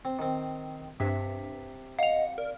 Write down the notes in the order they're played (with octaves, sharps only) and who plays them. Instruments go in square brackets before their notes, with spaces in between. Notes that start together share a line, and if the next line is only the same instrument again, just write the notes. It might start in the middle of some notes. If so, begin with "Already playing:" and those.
[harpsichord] C4
D#3 C4
[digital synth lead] G2 [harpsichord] C3 E5
[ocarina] D#5 [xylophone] F5 F7 [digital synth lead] F#5
[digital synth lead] A#4 [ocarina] D5